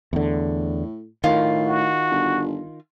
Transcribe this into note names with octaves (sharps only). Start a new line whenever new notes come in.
E2 A2 D3
A2 D#3 F4
F#4
G1